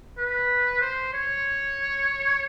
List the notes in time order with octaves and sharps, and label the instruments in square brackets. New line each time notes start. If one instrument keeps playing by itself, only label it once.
[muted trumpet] B4
C5
C#5